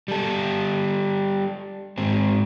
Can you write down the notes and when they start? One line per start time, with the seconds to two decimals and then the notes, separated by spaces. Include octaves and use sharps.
0.08 G3 A4
1.98 G#2 C4